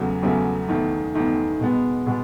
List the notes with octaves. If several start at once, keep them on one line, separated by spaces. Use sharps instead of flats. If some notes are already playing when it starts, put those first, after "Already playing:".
Already playing: E2 C#3 F#3 A3
E2 C#3 F#3 A3
E2 D#3 A3
E2 D#3 A3
B2 G#3 B3
B2 G#3 B3